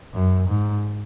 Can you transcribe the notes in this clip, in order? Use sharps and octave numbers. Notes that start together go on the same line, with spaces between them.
F#2
G#2